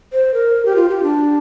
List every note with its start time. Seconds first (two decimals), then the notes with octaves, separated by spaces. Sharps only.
0.13 C5
0.34 A#4
0.65 G4
0.76 F4
0.89 G4
1.03 D4